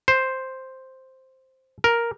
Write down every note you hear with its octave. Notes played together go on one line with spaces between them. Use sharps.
C5
A#4